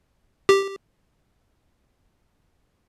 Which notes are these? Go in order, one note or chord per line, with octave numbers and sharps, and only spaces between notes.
G4